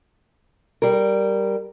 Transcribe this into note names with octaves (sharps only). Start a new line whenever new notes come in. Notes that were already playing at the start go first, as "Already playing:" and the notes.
G3 A#4